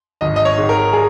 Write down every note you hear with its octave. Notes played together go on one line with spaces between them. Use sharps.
G#1 D#5
D#5
C#5
G#2 D#3
A#4
G#4